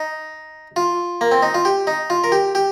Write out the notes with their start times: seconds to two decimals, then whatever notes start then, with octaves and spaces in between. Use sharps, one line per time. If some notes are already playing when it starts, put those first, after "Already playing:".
Already playing: D#4
0.76 F4
1.21 A#3
1.32 C4
1.42 D#4
1.54 F4
1.65 G4
1.87 D#4
2.10 F4
2.24 A#4
2.32 G4
2.55 G4